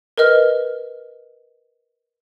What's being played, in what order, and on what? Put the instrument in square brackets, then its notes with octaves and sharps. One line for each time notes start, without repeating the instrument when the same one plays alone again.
[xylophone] A#4 B4 D#5 F6